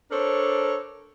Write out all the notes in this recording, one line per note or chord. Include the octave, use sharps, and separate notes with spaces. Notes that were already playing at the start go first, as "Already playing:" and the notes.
D4 A4 A#4 C5 C#5